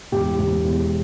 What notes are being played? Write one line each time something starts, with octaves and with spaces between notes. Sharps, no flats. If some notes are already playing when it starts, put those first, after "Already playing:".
E1 G4
E1
E2